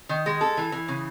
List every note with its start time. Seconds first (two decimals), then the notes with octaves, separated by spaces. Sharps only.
0.09 D#3
0.26 G#3
0.41 A4
0.57 E3
0.72 E3
0.88 C#3